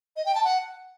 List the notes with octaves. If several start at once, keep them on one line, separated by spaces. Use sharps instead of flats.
D#5
G5
A5
F#5